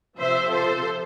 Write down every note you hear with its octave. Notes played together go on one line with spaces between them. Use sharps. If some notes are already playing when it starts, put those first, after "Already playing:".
C3 F3 C5 E5
A4 C5